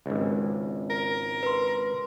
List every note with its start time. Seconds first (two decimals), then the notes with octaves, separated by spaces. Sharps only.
0.06 G#1 C#2
0.90 A#4
1.43 B4 C6